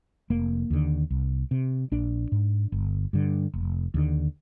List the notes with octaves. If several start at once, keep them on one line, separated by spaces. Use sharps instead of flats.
F1 A#3
D#2 D3
C2
C3
A#1 D4
G#2
G1
G2 D3
F1
D#2 D3